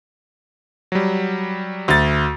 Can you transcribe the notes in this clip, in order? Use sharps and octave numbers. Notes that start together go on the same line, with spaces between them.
F#3 G3
D2 A6